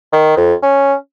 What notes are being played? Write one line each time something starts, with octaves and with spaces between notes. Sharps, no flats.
D#3
F2
C#4